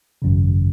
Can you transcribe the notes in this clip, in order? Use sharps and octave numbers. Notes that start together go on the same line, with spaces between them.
G#1 F#2 C#3